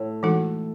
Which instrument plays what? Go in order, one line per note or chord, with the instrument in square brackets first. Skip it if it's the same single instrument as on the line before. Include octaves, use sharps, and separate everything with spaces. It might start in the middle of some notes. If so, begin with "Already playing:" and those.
Already playing: [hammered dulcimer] A2
[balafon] E3 G#3 D#4 F#4 A4